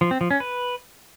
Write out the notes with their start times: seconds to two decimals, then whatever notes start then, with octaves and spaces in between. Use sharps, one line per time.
0.01 F3
0.11 C4
0.21 F3
0.31 C#4
0.40 B4